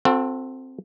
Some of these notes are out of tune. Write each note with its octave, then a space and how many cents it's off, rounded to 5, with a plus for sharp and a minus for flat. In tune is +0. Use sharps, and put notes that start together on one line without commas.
C4 +0 F#4 -35 A4 +20